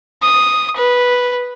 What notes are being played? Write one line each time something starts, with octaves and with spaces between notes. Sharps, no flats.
D#6
B4